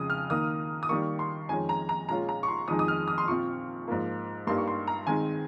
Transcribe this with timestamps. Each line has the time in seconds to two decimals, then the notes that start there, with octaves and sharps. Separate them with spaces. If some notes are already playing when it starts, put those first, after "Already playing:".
Already playing: F2 C#3 G#3 D#6
0.10 F6
0.30 D#3 A#3 D#4 D#6
0.83 D#6
0.89 D#3 G3 A#3 C#6
1.19 C6
1.49 F2 D#3 G#3 C#4 G#5
1.69 A#5
1.89 A#5
2.09 A#2 G#3 C#4 F4 A#5
2.29 A#5
2.43 C#6
2.48 C6
2.68 F2 D#3 G#3 D#4 D#6
2.79 D#6
2.88 F6
3.08 D#6
3.18 C6
3.28 A#2 F3 C4 F4 C#6
3.88 G#2 F3 A#3
4.47 G2 G3 A#3 D#4 C6
4.58 C#6
4.67 C6
4.87 A#5
5.07 D#3 G#3 C4 D#4 G#5